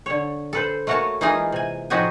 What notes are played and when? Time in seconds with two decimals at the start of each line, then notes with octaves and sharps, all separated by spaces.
0.06 D3 C#5
0.53 A4 B4 C5
0.87 A3 A#3 F#4 C#5 G#5 A5
1.21 E3 G#3 A#3 D#4 F4 G#4
1.52 C3 G#5
1.90 A2 F3 D#4 F#4 G4 G#5